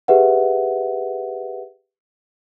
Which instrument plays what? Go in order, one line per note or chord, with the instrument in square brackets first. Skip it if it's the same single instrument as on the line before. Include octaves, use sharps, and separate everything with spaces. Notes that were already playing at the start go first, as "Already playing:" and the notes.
[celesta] G4 G#4 B4 E5 F#5